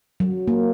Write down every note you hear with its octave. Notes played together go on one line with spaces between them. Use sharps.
F#3
A#3